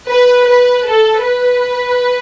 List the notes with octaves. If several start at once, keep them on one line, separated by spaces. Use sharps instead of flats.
B4
B4
A4
B4